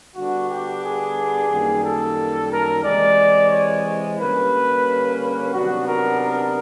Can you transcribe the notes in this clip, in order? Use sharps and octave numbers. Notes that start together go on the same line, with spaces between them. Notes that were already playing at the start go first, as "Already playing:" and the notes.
D3 G3 B3 D4 F#4
G4
G#4
F#2 D#3 G3 A#3
A4
A#4
C3 E3 G#3 D5
C#5
D3 G3 A#3 C#4 B4
B4
C3 D#3 F#3 B3 D4 F#4
A#4
A#4